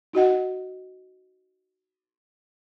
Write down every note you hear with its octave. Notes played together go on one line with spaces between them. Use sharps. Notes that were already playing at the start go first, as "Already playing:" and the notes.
D#4 F#4 D#5 F#5